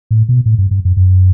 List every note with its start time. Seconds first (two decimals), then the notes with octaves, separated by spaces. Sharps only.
0.11 A2
0.29 B2
0.46 A2
0.58 G2
0.71 G2
0.85 F#2
0.97 F#2